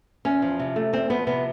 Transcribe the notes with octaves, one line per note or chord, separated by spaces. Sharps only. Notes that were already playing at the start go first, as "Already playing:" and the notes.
E2 C#4
F3
C3
A3
E2 C4
F3 B3
C3 B3